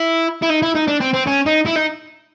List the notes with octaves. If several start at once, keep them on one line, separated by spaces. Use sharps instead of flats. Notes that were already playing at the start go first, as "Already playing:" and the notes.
Already playing: E4
E4
D#4
E4
D#4
D4
C4
C4
C#4
D#4
E4
D#4